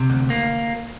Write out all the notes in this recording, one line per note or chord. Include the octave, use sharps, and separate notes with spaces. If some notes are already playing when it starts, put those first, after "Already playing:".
Already playing: C3
D2
A#3